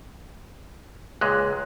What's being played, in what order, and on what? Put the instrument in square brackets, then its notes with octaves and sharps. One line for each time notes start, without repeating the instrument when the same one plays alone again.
[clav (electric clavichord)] C#2 A#2 G#3 [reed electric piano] F#6